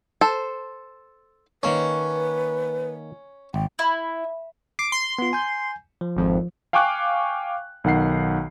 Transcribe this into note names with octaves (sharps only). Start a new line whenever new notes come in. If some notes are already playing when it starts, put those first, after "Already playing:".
A4 C5
D#3 A#3 C#4 B4 C#5
G#1 G5
E4
D6 C7
C6
B3 F4
G#5 G6
F3
G#1 F2
F5 G5 G#5 C#6 D6 F#6
B1 D#3 F#5 C7